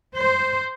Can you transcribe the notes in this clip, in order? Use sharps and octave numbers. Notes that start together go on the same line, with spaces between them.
C5